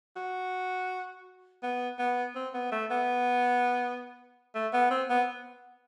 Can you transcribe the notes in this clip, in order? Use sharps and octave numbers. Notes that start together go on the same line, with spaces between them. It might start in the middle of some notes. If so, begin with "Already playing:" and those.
F#4
B3
B3
C4
B3
A3
B3
A3
B3
C4
B3